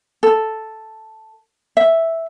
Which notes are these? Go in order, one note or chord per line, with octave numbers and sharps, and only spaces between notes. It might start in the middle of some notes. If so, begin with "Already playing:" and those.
A4
E5